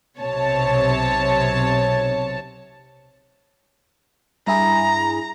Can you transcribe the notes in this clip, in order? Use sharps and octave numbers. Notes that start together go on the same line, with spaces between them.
B1 C3 C#5 A5
G2 E4 G#4 A#5